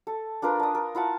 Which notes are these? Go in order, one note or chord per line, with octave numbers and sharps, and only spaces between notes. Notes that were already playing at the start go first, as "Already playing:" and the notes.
A4
D4 F4 A#4 B4
A5 D#6
A#4
E4 F4 F#5 A5